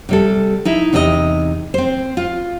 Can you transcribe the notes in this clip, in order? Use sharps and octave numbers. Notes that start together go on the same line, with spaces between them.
C3 G3 A4
D#4 E4 E5
E2 C3 D#4 A4 D#5
C4 C5
F4